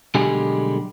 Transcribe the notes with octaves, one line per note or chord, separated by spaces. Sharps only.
B1 D3 G3 G#3 G4 G#5